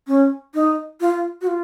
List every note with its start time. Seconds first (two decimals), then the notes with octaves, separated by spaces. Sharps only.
0.07 C#4
0.54 D#4
1.01 F4
1.41 F#4
1.47 F4